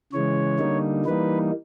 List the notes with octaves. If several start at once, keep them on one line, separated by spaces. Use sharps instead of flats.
C#3 E3 G#3 C#5
D3 G3 A#3 D#4
E3 G3 A#3 D#4 B4